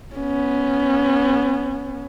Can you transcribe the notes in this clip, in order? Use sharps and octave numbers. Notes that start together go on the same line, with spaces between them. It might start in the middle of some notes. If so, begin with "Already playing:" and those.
B3 C#4